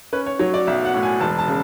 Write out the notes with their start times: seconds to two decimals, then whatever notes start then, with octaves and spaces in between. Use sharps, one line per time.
0.13 C#4 B4
0.26 C#5
0.39 F#3 C#5
0.54 D5
0.67 B1 E5
0.85 F#5
0.94 A2
1.03 G#5
1.21 E1 A5
1.38 A5
1.48 C#3